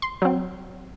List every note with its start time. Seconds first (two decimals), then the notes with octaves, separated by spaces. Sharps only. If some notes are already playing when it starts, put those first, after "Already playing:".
0.02 C6
0.22 F#3 C4